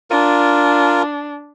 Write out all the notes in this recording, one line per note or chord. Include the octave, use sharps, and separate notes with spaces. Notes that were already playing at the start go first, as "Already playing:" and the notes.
D4 F4 A#4